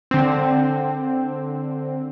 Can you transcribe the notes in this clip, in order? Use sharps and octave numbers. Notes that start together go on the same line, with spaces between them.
D3 C4